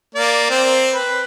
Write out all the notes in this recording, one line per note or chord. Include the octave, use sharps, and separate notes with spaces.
A#3 D5
C4
B4